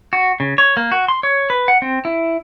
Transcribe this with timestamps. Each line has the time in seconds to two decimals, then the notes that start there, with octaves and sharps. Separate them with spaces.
0.13 F#4
0.40 C#3
0.58 C#5
0.77 A#3
0.92 F#4
1.08 C6
1.23 C#5
1.50 B4
1.68 F#5
1.82 C4
2.05 E4